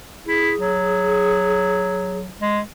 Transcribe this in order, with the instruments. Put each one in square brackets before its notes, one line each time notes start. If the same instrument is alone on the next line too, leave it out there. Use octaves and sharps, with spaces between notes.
[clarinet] E4 [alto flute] G#4
[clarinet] F#3
G#3